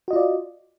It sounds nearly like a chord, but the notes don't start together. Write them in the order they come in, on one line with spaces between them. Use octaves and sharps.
F#4 D#5 F4 D5